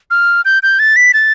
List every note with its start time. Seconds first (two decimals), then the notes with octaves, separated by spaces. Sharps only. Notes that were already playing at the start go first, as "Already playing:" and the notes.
0.11 F6
0.45 G6
0.63 G6
0.79 A6
0.96 B6
1.14 A6